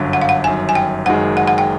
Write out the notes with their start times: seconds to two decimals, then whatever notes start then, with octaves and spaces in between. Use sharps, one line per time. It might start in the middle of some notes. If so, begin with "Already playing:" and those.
Already playing: G1 F#2 D3
0.13 F#5
0.22 F5
0.29 F#5
0.44 G1 F#2 D#3 G#5
0.69 G#5
0.75 G5
1.05 F#1 F#2 D#3 G#3 F#5
1.37 F#5
1.48 F#5
1.58 G5